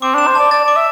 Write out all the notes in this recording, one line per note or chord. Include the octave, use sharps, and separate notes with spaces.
C4 D6
D4 E7
C5
D5 A5
D5 A6
D5 D6
E5